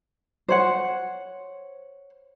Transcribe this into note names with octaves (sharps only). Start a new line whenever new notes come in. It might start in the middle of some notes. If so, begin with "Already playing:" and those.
C5 C#5 F#5